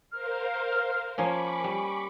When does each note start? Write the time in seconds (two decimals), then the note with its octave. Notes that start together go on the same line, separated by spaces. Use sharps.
0.12 A#4 C5 F5 F6
1.18 F3 A#3 C#4 G#5 B5 C#6 D6
1.64 G3